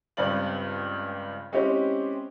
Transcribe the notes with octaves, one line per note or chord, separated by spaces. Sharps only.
C#2 G2 C4 D5 F#7
G#3 C4 C#4 E4 G4